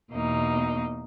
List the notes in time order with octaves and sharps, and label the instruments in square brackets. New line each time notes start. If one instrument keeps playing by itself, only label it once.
[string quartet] E2 B2 A#3 D#4